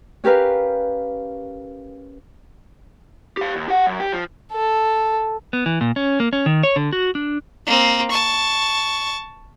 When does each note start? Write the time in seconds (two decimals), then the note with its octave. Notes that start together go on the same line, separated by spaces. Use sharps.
0.24 C#4 G4 A#4 B4 F5
3.37 G4 F5
3.56 D#2
3.68 G4 F#5
3.87 F#2
4.00 G4
4.12 F3
4.52 A4
5.53 B3
5.66 E3
5.81 A#2
5.96 C#4
6.20 A#3
6.33 C#4
6.46 D#3
6.63 C#5
6.76 D3
6.93 F#4
7.15 D4
7.66 A#3 C4
8.10 A5 C#6